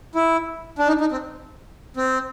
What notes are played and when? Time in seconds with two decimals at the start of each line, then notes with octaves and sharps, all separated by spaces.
0.15 E4
0.78 D4
0.88 D#4
1.00 D#4
1.12 C4
1.97 C4